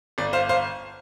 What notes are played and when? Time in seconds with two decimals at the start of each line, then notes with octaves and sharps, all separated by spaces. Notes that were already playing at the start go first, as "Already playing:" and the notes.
0.18 G1 D5
0.33 C5 F5
0.49 C5 F5